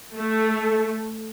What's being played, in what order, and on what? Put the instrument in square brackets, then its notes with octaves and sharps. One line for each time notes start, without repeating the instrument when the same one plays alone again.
[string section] A3